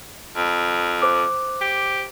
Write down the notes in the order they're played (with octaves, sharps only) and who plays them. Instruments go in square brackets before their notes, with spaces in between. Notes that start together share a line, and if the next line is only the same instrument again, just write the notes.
[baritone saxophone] F2
[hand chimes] C5 D6
[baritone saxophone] G4